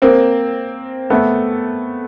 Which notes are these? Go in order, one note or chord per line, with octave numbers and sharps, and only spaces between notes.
A#3 C4
A3 B3